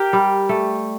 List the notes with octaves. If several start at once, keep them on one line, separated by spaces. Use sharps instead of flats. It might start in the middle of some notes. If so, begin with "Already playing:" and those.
Already playing: G4 A#4
G3
A3